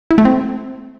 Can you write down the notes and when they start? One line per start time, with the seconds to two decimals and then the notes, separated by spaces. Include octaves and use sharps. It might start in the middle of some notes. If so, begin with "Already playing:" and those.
0.11 E4
0.18 A3
0.25 C4